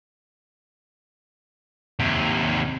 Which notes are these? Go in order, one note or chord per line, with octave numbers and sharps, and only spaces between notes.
D#2 C3